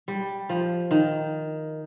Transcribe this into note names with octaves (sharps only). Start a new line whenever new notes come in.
G3
F3
D#3